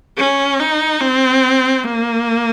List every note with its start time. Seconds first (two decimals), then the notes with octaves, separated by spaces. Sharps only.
0.17 C#4
0.59 D#4
1.00 C4
1.84 A#3